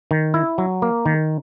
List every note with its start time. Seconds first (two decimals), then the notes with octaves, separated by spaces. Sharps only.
0.11 D#3
0.34 E4
0.58 F#3
0.82 A#3
1.06 D#3